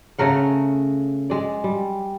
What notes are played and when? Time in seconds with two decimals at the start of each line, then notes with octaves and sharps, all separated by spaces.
0.19 C#3 A3 A#4 F#5
1.30 G#3 D5
1.64 G3